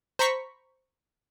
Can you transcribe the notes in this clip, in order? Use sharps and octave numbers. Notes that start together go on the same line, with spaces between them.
C5 A#5 B5 C#6 B6